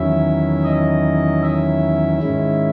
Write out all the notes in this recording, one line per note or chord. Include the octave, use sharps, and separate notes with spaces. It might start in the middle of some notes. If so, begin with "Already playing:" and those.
Already playing: E2 D#3 F#3 C#4 E4 E5
D#5
E5
G#2 D#3 G#3 C#4 E4